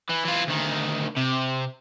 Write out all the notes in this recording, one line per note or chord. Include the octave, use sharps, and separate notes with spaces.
E3
E3 F4
D2 D#3
C3